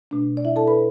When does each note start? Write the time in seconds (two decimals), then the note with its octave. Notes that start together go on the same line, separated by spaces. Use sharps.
0.11 B2 A3 D4
0.37 D5
0.45 E4 E5
0.56 A4 A5
0.67 B4 B5